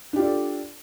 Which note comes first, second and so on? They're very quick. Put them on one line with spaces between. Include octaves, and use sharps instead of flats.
D4 G4 F4 D5 A4